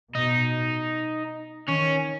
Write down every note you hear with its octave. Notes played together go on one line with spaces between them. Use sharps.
B2 D#4
D#3 C#4